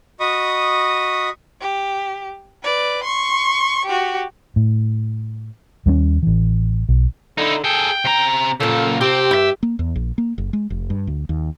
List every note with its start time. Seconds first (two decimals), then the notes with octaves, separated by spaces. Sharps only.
0.20 F#4 D#5 B5 C#6 D#6
1.61 G4
2.63 B4 D5
3.03 C6 C#6
3.85 F#4 G4
4.56 A2
5.86 D#2 G3 B3 C#4
6.23 A1 E3
6.89 B1
7.38 D3 D#4 E4
7.64 G#4 A4 G5
8.05 C3 A#5
8.60 A#2 C#3 F3 A#3 A4
9.01 C3 C4 G4
9.31 G2 E4 E5
9.63 A#3
9.79 E2
9.96 A#1
10.18 A#3
10.38 F#1
10.53 G#3
10.70 F1
10.90 G2
11.07 D2
11.29 D#2